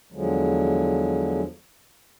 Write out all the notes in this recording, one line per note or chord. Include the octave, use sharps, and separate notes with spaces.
E2 D3 F3 F#3 G#3